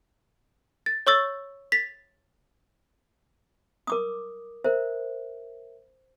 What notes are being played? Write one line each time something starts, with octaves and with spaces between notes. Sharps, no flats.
A6
C#5 C#6 E6 A6
A6 B6
A#4 D6 D#6
A#4 C5 E5